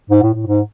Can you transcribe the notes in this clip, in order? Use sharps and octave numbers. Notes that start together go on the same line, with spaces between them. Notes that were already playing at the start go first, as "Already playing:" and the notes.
G#2
A2
A2
G#2